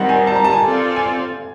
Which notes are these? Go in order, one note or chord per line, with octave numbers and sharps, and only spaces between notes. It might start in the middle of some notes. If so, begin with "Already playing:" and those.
Already playing: D#3 G3 C4 F#5
G#5
A5
A#5
A5
G#5
C4 F4 A4 D5
G#5